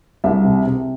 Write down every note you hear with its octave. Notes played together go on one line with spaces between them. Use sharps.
C2 E5
C3
C3